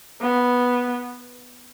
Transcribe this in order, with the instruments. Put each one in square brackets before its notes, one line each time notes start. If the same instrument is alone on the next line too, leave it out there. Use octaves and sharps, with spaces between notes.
[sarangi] B3